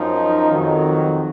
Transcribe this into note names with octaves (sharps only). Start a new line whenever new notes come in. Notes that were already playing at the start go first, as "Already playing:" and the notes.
Already playing: F#2 F3 D#4
F2 D#3 F#3